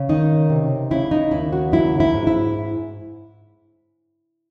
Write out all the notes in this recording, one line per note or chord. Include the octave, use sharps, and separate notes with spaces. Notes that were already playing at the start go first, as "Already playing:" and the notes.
Already playing: C#3
D#3 D#4
C3
C#3 E4
D#4
D#2 E4
F#4
F#3 E4
E4
G#2
E4